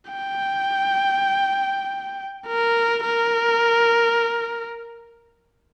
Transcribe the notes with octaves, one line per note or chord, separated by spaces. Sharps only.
G5
A#4
A#4